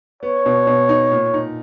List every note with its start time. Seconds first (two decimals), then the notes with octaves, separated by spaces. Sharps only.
0.23 B3 C#5
0.46 B2
0.67 B2
0.89 D#4
1.12 A#2
1.34 D#4